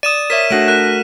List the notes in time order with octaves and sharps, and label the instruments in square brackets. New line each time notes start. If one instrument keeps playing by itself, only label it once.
[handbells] D5 D#6 [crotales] D#7 E7
[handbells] A#4 C#5 E5 [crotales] B6
[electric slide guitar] A3 F#4 [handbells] D4 A#6 D7
[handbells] A#4 [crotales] F#6